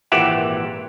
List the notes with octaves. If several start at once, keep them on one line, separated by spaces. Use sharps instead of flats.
G#1 A#2 E3 G4 E5 F#5